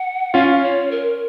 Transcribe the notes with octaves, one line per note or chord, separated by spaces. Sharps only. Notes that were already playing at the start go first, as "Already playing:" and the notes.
Already playing: F#5
C#4 F4 F5
C#5
A#4